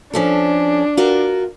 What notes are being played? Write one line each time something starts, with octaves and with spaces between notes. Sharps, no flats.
F3 C#4 D4 A4
F4 F#4 A#4